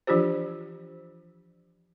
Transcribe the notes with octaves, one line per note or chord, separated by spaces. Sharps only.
E3 F3 D4 F4 G4 C5